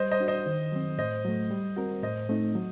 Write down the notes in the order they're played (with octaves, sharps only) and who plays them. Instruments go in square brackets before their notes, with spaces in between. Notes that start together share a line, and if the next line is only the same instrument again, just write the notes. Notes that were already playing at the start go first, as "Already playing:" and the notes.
Already playing: [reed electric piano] G3 [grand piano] C5 D#5
[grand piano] C5 D#5
[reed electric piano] D4 F#4
[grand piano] C5 D#5
[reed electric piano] D#3
F#3 C4
[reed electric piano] A2 [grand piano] C5 D#5
[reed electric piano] F#3 A3
G3
C4 F#4 A#4
[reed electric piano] A2 [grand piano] C5 D#5
[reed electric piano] A3 C4 D#4
F#3